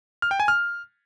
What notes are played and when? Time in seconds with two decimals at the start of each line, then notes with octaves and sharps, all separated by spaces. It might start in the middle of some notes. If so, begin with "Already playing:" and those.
0.22 F6
0.31 G5
0.40 G#5
0.48 F6